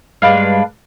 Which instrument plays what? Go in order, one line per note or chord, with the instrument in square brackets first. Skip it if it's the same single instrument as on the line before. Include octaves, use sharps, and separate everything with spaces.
[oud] G2 G3 G#3 [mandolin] D4 B4 F5